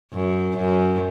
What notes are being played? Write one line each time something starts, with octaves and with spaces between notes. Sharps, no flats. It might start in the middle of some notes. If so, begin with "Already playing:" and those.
F#2
F#2